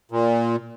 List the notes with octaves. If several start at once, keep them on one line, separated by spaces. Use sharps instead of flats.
A#2